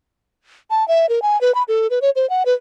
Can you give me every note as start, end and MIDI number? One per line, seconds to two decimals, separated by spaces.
0.70 0.86 81
0.88 1.06 76
1.09 1.22 70
1.22 1.40 80
1.41 1.54 71
1.55 1.63 83
1.68 1.87 69
1.90 1.99 71
2.02 2.10 73
2.16 2.28 72
2.30 2.43 78
2.46 2.54 71